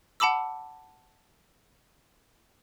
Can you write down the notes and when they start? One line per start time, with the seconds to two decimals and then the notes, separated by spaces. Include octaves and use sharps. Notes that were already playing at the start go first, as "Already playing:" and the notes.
0.20 F#5 A5 B5 D6 E6